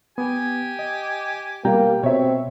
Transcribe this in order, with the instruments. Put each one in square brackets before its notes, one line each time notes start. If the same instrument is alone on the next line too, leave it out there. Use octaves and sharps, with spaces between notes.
[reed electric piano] B3 [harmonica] G4 G#5
[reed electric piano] D#5
[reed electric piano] B2 G5 A#5 [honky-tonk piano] G3 [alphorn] A#3
[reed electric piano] B2 [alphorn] C4 [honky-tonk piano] C#5 E5